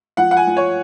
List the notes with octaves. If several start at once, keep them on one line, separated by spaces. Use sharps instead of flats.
F3 F#5
F#5
G#5
F3
C#5